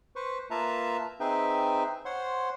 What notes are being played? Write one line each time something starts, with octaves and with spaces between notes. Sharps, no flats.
B4 C5 C#6
A#3 F4 B4 E5 A5 A#5
C4 D#4 G#4 B4 E5 G5
C5 C#5 F#5 C6